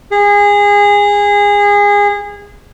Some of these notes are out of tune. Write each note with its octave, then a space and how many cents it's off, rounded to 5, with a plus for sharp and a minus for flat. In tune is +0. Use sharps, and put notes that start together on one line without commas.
G#4 -25